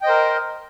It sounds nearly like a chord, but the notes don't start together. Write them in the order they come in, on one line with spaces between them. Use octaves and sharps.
G5 D#5 C5 A#4